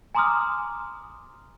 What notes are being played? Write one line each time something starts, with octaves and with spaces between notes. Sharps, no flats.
G#5 A#5 C6 D6 D#6 F6